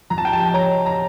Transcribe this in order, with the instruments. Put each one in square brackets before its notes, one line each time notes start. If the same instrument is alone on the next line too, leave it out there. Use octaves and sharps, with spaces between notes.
[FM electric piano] F3 [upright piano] A#5
[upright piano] A5
G5
A5
[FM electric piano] C#5 [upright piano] A#5
[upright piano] A#5